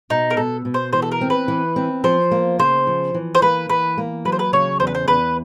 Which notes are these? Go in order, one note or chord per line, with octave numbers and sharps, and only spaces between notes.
B2 D#4
A#4
B2 A4
B2
C5
E3 C5
A4
A#4
C4
B4
E3
C4
F3 C5
A#3
C#3 C5
F3
E3
C5
A#3 B4
E3 B4
A#3
F#3 B4
C5
B4
C#3 C#5
E2 C5
B4
C5
E2 B4